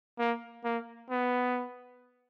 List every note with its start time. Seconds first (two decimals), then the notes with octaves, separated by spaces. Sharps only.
0.19 A#3
0.64 A#3
1.10 B3